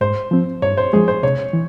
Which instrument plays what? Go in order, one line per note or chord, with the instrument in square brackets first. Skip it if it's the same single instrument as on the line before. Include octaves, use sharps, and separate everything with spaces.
[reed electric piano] G#2 [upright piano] C5
[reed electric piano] F3 C4
[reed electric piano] G2 [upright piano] C#5
[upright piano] C5
[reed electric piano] F3 G#3 [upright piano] G#4
[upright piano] C5
[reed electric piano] C3 [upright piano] C#5
[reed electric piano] E3